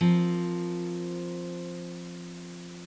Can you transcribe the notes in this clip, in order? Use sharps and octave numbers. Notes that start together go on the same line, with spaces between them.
F3 C4 A#4